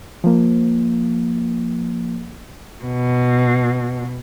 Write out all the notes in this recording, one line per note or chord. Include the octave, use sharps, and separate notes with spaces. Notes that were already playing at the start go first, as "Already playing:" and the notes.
F3 A#3
B2